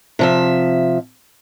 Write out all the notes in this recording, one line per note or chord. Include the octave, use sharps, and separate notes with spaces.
C3 F3 E5